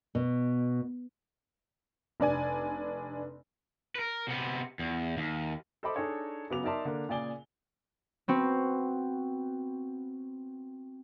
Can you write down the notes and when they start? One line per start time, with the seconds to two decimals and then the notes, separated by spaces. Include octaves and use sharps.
0.15 B2
2.20 F1 D4 D5 G#5
3.95 A#4 B4
4.28 C3 B3
4.79 E2
5.17 D#2
5.83 A4 C5 D#5 E5 B5 D6
5.95 D4 D#4 G#4 A4 C#5 D#5
6.50 C#3 F#3 B3 D6 F7
6.64 D#4 A#4 D5 E5 A5 C6
6.85 D3 A#3 D4
7.09 A#2 C#3 G#4 D5 G#5 G7
8.28 B3 C4 F#4